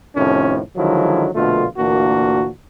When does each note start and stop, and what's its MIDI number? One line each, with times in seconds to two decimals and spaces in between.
0.16 0.59 41
0.16 0.59 45
0.16 0.59 48
0.16 0.59 51
0.16 0.59 53
0.16 0.59 61
0.76 1.29 50
0.76 1.29 51
0.76 1.29 53
0.76 1.29 54
0.76 1.29 56
0.76 1.29 64
1.35 1.65 34
1.35 1.65 47
1.35 1.65 50
1.35 1.65 57
1.35 1.65 65
1.77 2.48 38
1.77 2.48 46
1.77 2.48 52
1.77 2.48 58
1.77 2.48 62
1.77 2.48 66